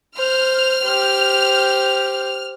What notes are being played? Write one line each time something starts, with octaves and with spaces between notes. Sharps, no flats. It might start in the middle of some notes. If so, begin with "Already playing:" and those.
C5 F6
G4 C5